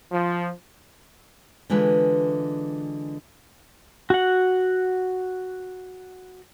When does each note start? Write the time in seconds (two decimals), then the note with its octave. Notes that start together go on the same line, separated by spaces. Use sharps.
0.12 F3
1.70 D3 E3 G#3 F4 B4
4.10 F#4 F#5